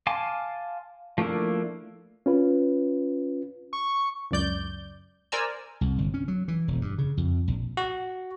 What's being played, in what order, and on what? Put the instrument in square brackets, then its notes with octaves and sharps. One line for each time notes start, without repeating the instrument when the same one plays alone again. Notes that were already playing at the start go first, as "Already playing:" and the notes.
[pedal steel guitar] F5 G#5 A5 C6 D6
F3 A3 A#3 D4 E4
[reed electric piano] C#4 F4 B4
[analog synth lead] C#6
[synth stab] C#2 F#2 D5 G6
A#4 C5 D5 G#5 A#5 E6
[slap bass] C2
G1
C#4
F#3
E3
E1
G2
C#3
F2
A#1
[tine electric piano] F#4